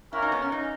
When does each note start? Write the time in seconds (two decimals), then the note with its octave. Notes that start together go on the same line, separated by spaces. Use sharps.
0.12 A#3 C#4 E4 F#4 A#4
0.22 D#4
0.32 B3
0.42 C#4
0.52 D#4